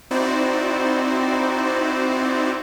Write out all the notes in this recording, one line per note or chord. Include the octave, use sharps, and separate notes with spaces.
C4 D#4 E4 F#4 C5 D5